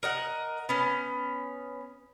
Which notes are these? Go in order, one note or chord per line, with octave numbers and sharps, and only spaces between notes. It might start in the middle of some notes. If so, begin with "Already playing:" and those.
A#4 D#5 F#5
B3 C#4